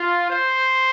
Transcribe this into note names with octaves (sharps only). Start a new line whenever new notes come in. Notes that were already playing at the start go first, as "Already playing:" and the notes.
Already playing: F4
C5